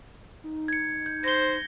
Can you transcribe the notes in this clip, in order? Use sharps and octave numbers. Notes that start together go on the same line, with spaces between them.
D#4
G#6 C#7
G6
C5 A#6 G7